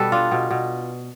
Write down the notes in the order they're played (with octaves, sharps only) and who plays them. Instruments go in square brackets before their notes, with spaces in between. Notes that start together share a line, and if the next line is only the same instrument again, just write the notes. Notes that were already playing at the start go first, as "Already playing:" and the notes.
Already playing: [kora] B2 G3 A4 B4
D4 F4
B2
B2